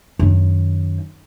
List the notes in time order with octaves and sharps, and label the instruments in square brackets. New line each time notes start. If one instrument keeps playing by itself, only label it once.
[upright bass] F#2 D#3